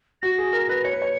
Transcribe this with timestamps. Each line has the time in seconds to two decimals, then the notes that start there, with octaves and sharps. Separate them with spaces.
0.22 F#4 A#6
0.38 G#4
0.53 A#4
0.69 B4
0.84 C#5 C#7
0.93 B4
1.02 C#5